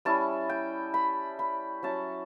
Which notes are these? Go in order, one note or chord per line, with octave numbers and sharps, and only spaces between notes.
G3 C#4 E4 A5
G5
B5
B5
F#3 C#4 E4 A5